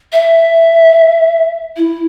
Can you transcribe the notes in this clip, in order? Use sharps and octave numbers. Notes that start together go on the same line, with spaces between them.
E5
E4